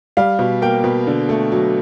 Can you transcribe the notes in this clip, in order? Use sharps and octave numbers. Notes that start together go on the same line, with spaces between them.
G3 F5
B2
A#3 G5
B2
D3
A3
F#3